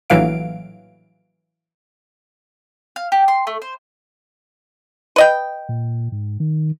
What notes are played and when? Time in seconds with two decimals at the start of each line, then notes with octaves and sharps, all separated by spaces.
0.10 A#1 A2 E3 F#3 F5 D7
2.96 F5
3.12 G4
3.28 C6
3.47 A3
3.62 C5
5.16 B4 D#5 G5
5.69 A#2
6.12 G#2
6.40 D#3